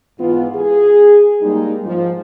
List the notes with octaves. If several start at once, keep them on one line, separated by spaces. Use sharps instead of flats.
G#2 E3 B3 F4
G#4
G3 G#3 A#3 D#4
G#2 F3